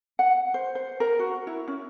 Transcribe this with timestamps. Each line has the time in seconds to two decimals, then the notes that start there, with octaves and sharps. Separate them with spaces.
0.19 F#5
0.54 C5
0.75 C5
1.00 A#4
1.19 F#4
1.47 E4
1.68 C#4